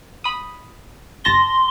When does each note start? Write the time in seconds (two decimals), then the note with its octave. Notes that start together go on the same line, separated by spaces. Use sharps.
0.24 B5 D#6
1.25 G1 A5 C6 A#6